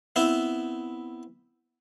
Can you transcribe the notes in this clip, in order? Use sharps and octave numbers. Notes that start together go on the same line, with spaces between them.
B3 C4 E4 E5